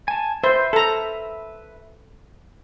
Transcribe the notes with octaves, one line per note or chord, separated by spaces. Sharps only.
G#5 A5
B4 C5 E5
A4 A#5